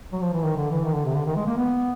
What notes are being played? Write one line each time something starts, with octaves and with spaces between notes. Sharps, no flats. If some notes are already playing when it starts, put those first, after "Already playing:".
F#3
F3
E3
D#3
D3
E3
D#3
D3
C3
D3
D#3
G#3
A#3
B3